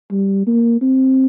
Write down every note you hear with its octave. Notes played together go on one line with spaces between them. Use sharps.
G3
A#3
C4